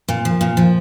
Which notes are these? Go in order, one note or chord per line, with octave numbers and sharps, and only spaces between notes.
A#2
F3
A#2
F3